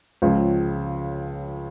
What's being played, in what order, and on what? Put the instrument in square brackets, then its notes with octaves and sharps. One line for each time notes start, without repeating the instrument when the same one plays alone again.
[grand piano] C#2 C#3 F3